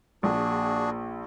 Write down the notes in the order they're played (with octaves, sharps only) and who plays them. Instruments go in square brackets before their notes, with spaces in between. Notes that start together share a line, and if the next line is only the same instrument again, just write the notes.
[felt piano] A#1 [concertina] D4 F#4 G#4